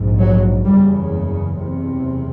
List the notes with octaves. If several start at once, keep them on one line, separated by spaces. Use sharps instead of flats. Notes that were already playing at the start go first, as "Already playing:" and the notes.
Already playing: A#1 G#2
F#3
F#1 E2 C#3 G3
F#1 E2 C3